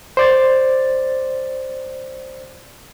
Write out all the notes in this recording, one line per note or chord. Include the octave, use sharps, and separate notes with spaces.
C5 D5 A6